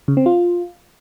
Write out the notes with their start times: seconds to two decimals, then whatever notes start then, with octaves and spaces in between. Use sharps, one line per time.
0.08 C#3
0.17 C4
0.26 F4